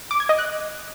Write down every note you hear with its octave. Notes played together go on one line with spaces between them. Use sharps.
D6
G#6
D#5
F#6